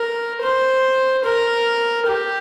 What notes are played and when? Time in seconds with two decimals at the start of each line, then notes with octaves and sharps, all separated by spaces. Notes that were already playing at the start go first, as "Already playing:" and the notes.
Already playing: A#4
0.42 C5
1.24 A#4
2.07 G4